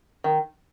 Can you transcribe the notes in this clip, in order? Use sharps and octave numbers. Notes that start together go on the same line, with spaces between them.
D#3